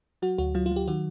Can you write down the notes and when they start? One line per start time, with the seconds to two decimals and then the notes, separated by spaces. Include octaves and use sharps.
0.22 F#3 F#4
0.38 D2 F#4
0.55 F#3 F4
0.66 F4
0.71 F#3 G4
0.88 D#3 F#4